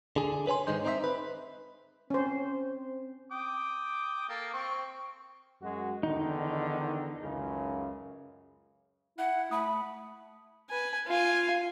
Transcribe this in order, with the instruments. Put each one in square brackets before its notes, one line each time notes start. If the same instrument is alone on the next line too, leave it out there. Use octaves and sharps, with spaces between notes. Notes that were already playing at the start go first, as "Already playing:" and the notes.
[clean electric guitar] D3 G#4
B4 C#5 G#5 C6
G#2 D3 D#3 G#3 D#4 C5
C4 D#4 C5 D5 E5
B4
[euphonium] C4 [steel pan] C#4 C5
[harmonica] G5 D6 D#6
A#3 A4 A#4
C4 C#6
[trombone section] F#2 G#3 F#4
[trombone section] E2 D3 D#3 [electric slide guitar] D#4
[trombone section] C#2 F#2 C#3
[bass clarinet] E4 [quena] F#5
[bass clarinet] A3 [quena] B5 [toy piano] D#6
[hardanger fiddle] B4 G#5
F4 G#5